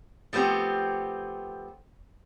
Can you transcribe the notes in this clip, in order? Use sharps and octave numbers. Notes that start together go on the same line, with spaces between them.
F3 A3 B3 C4 G4